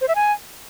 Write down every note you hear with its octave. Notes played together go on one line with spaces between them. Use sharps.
C5
E5
G#5